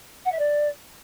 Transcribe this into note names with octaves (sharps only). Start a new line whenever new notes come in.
F#5
E5
D5